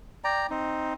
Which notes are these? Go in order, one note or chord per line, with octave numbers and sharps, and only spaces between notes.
D5 G5 A#5
C4 D#4